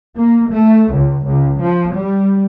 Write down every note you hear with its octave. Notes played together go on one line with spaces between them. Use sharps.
A#3
A3
C#2
C#2
F3
G3